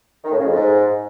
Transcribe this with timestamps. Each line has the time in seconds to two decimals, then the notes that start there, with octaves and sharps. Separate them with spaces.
0.24 D#3
0.31 A2
0.38 C#3
0.45 F2
0.52 G#2